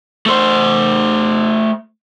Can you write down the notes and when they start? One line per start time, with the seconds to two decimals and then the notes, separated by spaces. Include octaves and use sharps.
0.26 A3 C5